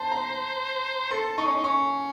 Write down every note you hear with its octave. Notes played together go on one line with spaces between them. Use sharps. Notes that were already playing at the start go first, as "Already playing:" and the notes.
Already playing: C5 A5 C6
A#5
A4 C6
D#4 C#6
C#4
D#4
C#4 C#6